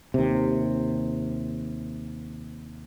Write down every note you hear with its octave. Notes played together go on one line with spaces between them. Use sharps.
D#2 C3